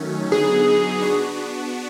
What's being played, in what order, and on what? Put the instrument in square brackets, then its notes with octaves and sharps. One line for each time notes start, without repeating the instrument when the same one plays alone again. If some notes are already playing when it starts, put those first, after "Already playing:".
Already playing: [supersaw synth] D#3 F#3 A3 C#4
[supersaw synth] D3 F#3 B3 D#4 [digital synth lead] G#4
[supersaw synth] B3 D4 F#4